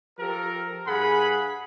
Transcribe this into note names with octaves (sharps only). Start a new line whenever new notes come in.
F3 G4 A4 A#4
G2 G#4 F5 F#5 G#5 B5